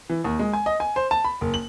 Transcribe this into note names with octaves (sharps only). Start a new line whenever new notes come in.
E3
D#2
G#3
G#5
D#5
G#5
C5
A5
B5
F#1
F#7